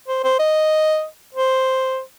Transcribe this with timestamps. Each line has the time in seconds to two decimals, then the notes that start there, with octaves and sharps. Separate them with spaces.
0.08 C5
0.24 C5
0.39 D#5
1.35 C5